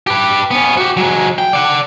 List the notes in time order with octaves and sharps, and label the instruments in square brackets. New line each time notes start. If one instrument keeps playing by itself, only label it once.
[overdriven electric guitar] G4 B4
B3 C#4
F#4 G4
F#3 G#3
G5
D5 F#5